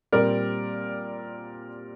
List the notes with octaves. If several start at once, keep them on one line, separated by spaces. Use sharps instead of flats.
A#2 G3 C4 A#4 D5